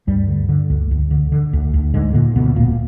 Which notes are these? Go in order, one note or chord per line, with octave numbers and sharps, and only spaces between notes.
D2 G2 G3
D3
D3
D2
D2
D3
D3
D2
D2
G#2 D3 G#3
A#2 D3 A#3
D2 B2 B3
E1 A#2 A#3